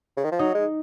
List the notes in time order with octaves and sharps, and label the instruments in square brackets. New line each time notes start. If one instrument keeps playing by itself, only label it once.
[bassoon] C#3
D#3
F3
[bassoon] F#3 [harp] D#4
[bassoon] G#3